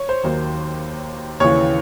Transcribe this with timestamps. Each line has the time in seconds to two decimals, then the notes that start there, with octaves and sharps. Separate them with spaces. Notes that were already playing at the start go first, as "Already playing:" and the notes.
Already playing: C#5
0.09 C5
0.23 D#2 D#3 F#3
1.40 D#2 C#3 E3 C#5